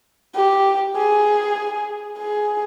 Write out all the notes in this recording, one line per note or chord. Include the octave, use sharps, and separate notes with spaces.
G4
G#4
G#4